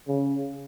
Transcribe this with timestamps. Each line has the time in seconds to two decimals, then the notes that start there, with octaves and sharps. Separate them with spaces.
0.08 C#3